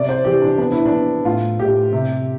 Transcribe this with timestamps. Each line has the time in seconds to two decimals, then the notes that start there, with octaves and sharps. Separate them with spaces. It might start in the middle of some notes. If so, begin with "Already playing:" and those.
Already playing: C3 D5
0.09 C5
0.24 E3 G4
0.42 D4
0.58 B3 D4
0.72 E4
0.86 D4
0.92 B3
1.25 A2 F4
1.59 A2 G4
1.93 C3